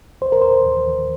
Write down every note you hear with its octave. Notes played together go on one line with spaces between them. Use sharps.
D#2 C5
A#4
D#2 C5
D#2
D#2